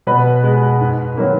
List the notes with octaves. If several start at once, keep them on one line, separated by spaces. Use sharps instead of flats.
B2 B4
G#3
G#2
D#3 F#3 A#3